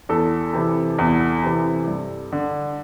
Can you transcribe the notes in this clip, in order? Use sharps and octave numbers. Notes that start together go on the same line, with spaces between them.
E2 A4
C3 E3
E2
C3 E3
G2
D3